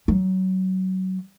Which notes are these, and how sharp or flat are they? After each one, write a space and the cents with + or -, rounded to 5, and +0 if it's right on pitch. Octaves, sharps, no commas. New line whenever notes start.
F#3 +20